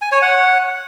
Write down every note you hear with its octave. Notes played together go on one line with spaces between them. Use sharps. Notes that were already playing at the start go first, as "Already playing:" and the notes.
G#5
C#5
F#5